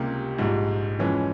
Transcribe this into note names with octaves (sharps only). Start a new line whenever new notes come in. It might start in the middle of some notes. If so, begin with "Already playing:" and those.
Already playing: C#2 C3 G3 A#3
A#1 G#2 G3
F2 C#3 E3 G#3 C#4